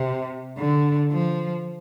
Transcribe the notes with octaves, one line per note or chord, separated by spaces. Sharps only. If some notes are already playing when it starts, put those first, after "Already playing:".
Already playing: C3
D3
F3